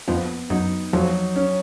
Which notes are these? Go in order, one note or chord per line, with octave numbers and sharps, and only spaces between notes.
F2 F3 B3
F#2 F#3 D#4
F2 F3 F#3
C#4